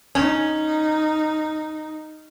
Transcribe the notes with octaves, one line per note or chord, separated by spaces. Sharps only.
C#4 D#4